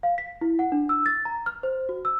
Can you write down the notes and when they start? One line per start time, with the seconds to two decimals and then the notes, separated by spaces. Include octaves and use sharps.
0.03 F5
0.18 B6
0.41 E4
0.59 F#5
0.72 D4
0.89 E6
1.06 A6
1.25 A#5
1.46 F6
1.63 C5
1.89 F#4
2.05 E6